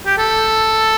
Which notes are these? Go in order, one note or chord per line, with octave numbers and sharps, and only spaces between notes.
G4
A4